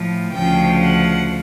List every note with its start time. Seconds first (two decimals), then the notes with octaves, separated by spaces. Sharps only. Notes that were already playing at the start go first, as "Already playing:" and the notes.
Already playing: A2 F3
0.34 D2 C#3 F3 G5
0.82 F#5